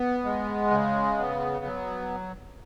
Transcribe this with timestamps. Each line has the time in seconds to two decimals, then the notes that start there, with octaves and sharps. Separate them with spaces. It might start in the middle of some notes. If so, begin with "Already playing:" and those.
Already playing: B3
0.24 G#3
0.71 C#3
1.18 B3
1.65 F#3